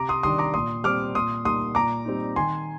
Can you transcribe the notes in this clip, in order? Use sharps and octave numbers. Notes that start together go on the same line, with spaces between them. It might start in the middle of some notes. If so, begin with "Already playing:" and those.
Already playing: C3 A#5 D6
C6 D#6
D#3 G3 D4 C6 D#6
A#5 D6
A#2 C6 D#6
G3 C4 D6 F6
A#2 C6 D#6
G3 A#3 D#4 C6 D#6
A#2 A#5 D6
G3 C4 D#4
D#3 G#5 C6